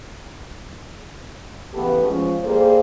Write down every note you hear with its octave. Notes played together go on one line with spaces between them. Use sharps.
C#3 E3 A3 B3 G4 A4
F3 G#3 C#4
G3 A#3 G#4 A4 C5